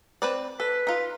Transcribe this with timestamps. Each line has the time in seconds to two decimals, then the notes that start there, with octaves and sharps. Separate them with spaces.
0.22 C4 B4 D5
0.60 A4 B4
0.87 D#4 F4